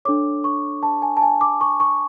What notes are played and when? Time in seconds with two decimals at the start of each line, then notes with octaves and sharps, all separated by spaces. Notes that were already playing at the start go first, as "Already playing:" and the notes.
0.05 D4 A4 C#5 D6
0.44 C#6
0.83 A5
1.02 G#5
1.17 A5
1.22 G#5
1.41 D6
1.61 C#6
1.80 C#6